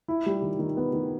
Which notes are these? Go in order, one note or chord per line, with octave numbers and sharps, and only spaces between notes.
E4
G3
D#3
D#3
B3
D#3